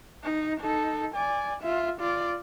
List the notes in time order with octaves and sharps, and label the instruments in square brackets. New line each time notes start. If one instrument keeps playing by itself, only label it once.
[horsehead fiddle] D#4
D#4 A4
D5 G#5
F4 E5
F4 D5